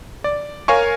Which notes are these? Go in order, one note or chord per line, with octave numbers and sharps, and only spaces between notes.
D5
A#4 C#5 F5 G#5 C#6